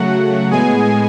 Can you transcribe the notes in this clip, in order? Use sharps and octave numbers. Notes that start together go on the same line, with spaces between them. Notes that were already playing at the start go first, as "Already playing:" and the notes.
Already playing: C#3 F#3 A3 F#4 F#5
A2 G#3 B3 G#4 G#5